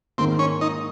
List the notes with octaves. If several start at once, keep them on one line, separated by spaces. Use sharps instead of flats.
G#2 D#3 A#3 C4
C#4
D#4